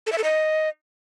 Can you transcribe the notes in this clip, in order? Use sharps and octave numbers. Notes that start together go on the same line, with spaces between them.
A4
E5
A4
D#5